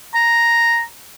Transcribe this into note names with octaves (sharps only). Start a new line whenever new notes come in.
A#5